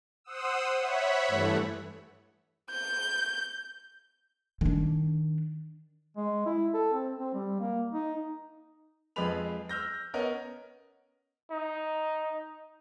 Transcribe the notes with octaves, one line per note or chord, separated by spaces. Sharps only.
C5 F#5 D#6 E6
C#5 E5 F#5 B5
G2 E3 A3
G6
D#3 D4
G#3
E4
A4
C4
C4
G3
A#3
D#4
F2 G#3 G#4 B4 B5 F7
E6 F6 G6 A#6
B3 C#4 A#4 D#5 F#5
D#4